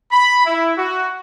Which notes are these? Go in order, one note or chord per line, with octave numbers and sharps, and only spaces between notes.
B5
E4
F#4